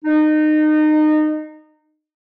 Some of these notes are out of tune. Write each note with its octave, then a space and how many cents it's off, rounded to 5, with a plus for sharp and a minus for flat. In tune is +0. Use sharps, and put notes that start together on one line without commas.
D#4 -25